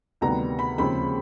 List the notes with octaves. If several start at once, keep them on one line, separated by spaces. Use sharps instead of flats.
D2 C3 D#3 G3 B3 A#5
B5
D#2 C#3 F3 G#3 C4 B5